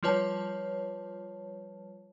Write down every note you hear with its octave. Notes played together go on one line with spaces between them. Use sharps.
F3 G3 F4 B4 C#5 A5